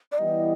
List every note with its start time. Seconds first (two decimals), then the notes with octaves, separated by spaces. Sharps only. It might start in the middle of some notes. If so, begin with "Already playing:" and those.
0.12 D5
0.18 E3 G3 B3 E4 G4 D#5